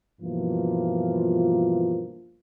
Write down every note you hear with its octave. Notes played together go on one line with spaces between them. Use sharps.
G2 B2 E3 F3 A#3 F4